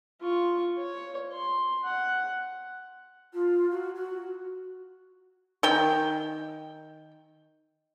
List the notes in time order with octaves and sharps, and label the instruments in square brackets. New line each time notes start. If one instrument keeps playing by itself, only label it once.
[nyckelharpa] F4 C#6
C#5
C6
F#5
[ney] F4
F#4
F#4
[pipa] D#3 G5